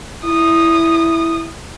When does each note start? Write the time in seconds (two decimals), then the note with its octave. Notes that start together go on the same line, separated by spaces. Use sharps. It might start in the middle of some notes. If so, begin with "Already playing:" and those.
0.25 E4 D#6